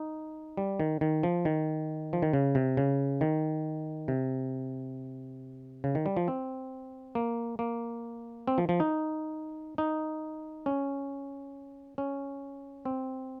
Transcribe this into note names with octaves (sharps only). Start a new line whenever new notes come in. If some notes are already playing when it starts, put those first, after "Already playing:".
Already playing: D#4
G3
D#3
D#3
F3
D#3
F3
D#3
C#3
C3
C#3
D#3
C3
C#3
D#3
G3
F3
C4
A#3
A#3
C4
F3
F3
D#4
D#4
C#4
C#4
C4